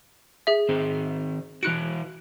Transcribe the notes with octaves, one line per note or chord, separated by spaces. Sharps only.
G#4 E5
D#3 C4 C5
E3 E4 F#4 F#6 C#7 D7